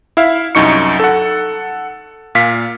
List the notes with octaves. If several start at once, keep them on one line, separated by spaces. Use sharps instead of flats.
E4 E5 F5
C2 F#2 D#4 C#6 C#7
A4 F#5
A#2 F5 B6